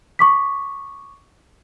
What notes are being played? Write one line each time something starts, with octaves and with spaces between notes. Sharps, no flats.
C#6 D6 B6